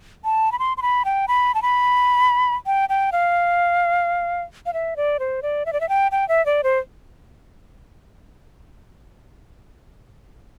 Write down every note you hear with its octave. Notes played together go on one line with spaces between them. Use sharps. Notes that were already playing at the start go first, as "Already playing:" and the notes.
A5
B5
C6
C6
B5
G5
B5
A5
B5
G5
G5
F5
F5
E5
D5
C5
D5
E5
D5
E5
G5
G5
E5
D5
C5